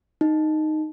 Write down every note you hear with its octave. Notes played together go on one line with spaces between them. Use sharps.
D#4